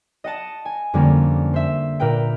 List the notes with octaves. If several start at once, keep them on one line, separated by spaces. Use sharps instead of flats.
D#5 F#5 A5
G#5
F2 D3 G3 A#3 C#4
C5 E5
A#2 A#4 B4 G5